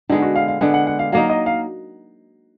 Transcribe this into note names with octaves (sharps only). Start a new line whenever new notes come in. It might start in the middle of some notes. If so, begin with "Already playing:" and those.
D3 G#3 B3 D#4
F#4
F5
F5
D3 G#3 B3 F#5
F#5
F#5
F5
F#3 A#3 D#4 F5
D#5
F5